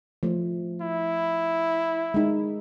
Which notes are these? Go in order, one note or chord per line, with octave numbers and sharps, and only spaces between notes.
F3 A3
E4
G#3 D#4